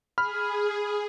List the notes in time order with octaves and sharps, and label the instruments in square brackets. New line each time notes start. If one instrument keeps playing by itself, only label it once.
[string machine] G#4 [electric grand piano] B5 F6